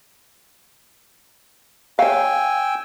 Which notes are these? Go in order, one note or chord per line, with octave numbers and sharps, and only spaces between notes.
C#5 F5 G5 G#5 E6